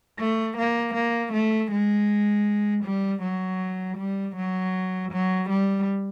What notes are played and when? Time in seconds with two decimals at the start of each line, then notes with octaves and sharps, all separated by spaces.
0.19 A3
0.58 A#3
0.94 A#3
1.33 A3
1.71 G#3
2.85 G3
3.22 F#3
3.98 G3
4.36 F#3
5.12 F#3
5.50 G3